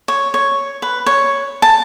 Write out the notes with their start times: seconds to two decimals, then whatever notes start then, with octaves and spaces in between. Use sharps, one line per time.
0.08 C#5
0.34 C#5
0.82 B4
1.06 C#5
1.62 A5